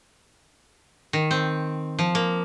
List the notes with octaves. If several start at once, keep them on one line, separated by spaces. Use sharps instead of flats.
D#3
C4
F3
A#3